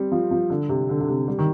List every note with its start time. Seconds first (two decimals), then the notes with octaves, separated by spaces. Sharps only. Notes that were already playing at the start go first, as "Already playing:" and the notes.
Already playing: G3 C4
0.12 F3
0.31 F3
0.50 D3
0.69 C3
0.89 D3
1.01 D3
1.08 C3
1.28 G3
1.39 D#3